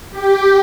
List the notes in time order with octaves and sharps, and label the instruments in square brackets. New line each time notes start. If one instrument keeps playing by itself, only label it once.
[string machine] G4